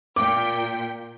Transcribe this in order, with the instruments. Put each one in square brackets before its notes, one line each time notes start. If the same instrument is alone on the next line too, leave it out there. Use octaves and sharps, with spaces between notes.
[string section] A#2 G5 [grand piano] D6